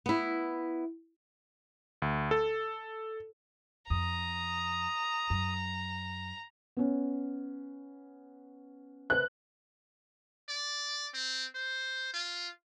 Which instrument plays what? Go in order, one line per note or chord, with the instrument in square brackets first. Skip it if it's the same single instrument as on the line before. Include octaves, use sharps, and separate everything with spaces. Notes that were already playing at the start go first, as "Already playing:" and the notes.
[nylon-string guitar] B3 E4
[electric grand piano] D2
A4
[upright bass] F2 [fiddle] A#5 [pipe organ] D#6
[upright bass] F#2
[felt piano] B3 C#4
[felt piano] B4 C5 [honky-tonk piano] F#6
[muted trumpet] D5
C4
C5
F4